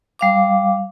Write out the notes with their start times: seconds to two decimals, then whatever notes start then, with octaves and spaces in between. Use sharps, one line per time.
0.19 G3 F5 D6